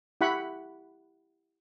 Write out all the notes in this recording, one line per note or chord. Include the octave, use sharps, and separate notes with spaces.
E4 G4 F#5 B5 C#6